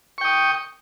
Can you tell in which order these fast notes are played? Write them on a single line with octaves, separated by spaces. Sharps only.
C#6 G5 D#6